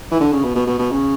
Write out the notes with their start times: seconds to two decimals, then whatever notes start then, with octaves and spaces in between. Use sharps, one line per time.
0.11 E3
0.20 D3
0.32 C#3
0.44 B2
0.55 B2
0.67 B2
0.79 B2
0.91 C#3